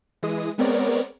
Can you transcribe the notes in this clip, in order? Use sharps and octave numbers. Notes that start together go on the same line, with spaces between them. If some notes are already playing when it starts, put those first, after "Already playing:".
E3 G#3 D#6
G#3 B3 C4 A#4 C#5 D5